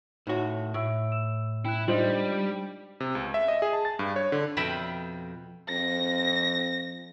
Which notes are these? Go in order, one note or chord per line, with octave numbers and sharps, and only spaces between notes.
A2 D#4 F#4 C#5 F#5
A2 E6 D7
E6 E7
E4 G5 F#6
G3 D4 D#4 F4 C5 D#5 F#7
C3
C#2
E5
D#5
G#4
A5
A6
G2
C#5
D3
F2 B2 E5 G5 B5
F2 A#6